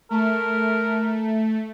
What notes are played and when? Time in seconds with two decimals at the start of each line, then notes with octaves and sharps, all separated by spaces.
0.10 A3 A#4